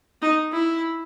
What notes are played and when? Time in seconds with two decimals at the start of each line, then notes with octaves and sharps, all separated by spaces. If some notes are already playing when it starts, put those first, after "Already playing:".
0.22 D#4
0.52 E4